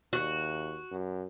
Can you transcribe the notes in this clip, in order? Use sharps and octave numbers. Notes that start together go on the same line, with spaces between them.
D#2 F#4
F#2